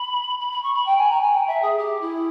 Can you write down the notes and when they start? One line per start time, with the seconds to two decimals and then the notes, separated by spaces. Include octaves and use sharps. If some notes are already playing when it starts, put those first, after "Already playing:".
Already playing: B5
0.40 B5
0.51 B5
0.63 C#6
0.74 B5
0.86 G5
0.98 G#5
1.09 A#5
1.21 G#5
1.32 G5
1.47 E5
1.62 G#4
1.78 G4
2.01 E4